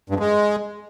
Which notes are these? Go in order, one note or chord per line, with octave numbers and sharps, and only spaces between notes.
G2
F2
G#3